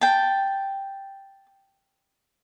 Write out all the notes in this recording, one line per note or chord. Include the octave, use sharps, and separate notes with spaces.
G5 A5